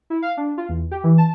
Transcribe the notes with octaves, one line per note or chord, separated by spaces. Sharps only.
E4
F5
D4
F4
E2
G4
E3
A5